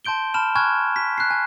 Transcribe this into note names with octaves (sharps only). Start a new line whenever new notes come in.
A5 C6 G6 D7 G7
A5 B5 F6 E7
G#5 B5 C#6 F6 F#6 G#6
B6
F#6 C7
G#5